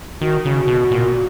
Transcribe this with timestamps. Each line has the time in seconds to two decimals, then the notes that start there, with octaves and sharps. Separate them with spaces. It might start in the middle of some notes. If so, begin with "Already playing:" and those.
0.21 D#3 F#4
0.44 C#3 F#4
0.68 B2
0.91 A#2